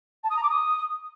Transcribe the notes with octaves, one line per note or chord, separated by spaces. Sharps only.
A5
D#6
A#5
D6
D#6